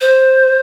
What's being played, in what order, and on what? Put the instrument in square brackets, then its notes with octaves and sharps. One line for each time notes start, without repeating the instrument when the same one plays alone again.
[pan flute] C5